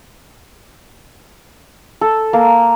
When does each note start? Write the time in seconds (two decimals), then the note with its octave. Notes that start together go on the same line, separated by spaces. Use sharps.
2.01 A4
2.33 A#3